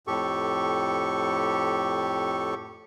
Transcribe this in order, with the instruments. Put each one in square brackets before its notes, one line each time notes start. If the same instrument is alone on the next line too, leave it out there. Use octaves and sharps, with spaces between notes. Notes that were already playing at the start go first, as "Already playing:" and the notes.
[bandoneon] F2 A2 G4 A4 C#6